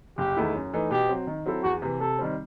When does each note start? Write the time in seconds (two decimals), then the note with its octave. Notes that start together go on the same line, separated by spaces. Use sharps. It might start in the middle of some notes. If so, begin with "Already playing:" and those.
0.18 F#1 G4
0.36 E2 D#3 A3 E4
0.55 F#2
0.73 E3 A3 D#4
0.91 B2 G4
1.09 F#3 C4
1.27 D#3
1.46 F#3 C4 E4 A4
1.63 E2 F#4
1.82 C3 E3
2.00 C3 A4
2.19 D#3 G3 C4